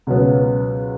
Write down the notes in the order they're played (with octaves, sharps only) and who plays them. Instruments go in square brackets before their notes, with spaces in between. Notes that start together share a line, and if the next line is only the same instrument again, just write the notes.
[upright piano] C#2 B2 F#3 B3